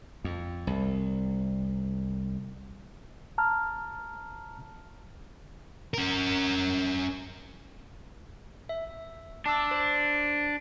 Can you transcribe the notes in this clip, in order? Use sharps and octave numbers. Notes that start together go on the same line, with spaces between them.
F2
C2
A5 A#5 F6
C#4 A#4
E5
D4 A5 D6 E6
C5